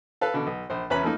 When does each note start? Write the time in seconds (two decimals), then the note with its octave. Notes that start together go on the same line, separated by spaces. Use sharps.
0.21 A4 B4 F5
0.34 B2 D3
0.47 B1
0.70 A#1 C5
0.90 E2 C#4 B4 A#5 B5
1.03 F3 A3 A#3 D#4